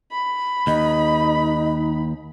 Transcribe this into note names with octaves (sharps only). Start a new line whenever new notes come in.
B5
D#2 D#4 D#5